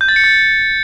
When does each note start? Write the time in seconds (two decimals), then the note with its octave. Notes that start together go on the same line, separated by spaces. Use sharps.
0.01 G6
0.08 A6
0.16 C#7
0.24 A6